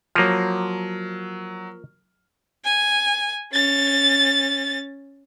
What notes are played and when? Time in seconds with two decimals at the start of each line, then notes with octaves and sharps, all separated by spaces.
0.15 F3 F#3 A#3 F6
2.65 G#5
3.53 C#4 A6